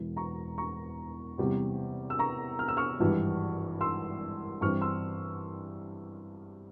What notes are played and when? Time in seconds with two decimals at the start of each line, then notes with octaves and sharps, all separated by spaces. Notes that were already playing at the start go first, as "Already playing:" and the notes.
Already playing: E1 E2 E3
0.16 A#5 C#6
0.58 A#5 C#6
1.38 E2 C3 G3
2.10 E6
2.19 A#5 C#6
2.59 F6
2.68 E6
2.77 C#6 F6
2.99 G#1 G2 E3 G3
3.81 C6 E6
4.61 G2 E3 G3 C4 C#6 F6
4.81 C6 E6